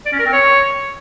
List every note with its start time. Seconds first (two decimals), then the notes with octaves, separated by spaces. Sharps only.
0.06 D5
0.12 C#4
0.19 A#4
0.26 C4
0.32 C#5